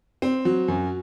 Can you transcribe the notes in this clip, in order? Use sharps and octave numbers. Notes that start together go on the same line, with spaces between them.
C4
F#3
F#2